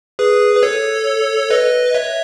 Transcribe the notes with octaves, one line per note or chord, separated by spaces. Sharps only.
G#4 B4
B4
A4 C#5
B4 D#5
C#5 E5